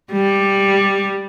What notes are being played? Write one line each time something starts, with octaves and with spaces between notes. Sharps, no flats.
G3